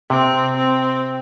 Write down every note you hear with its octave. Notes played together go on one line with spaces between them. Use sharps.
C3 C4
C4